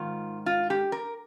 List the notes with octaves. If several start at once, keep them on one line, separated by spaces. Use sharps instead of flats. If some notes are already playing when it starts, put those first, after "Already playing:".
Already playing: G#2 D#3 F4
F4
G4
A#4